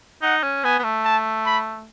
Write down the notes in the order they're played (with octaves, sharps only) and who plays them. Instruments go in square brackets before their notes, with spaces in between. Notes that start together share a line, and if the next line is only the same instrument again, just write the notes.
[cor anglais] D#4 [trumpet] F#5
[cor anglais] C#4
[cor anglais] B3 [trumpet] G#5
[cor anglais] B3
A3
[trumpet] A5
B5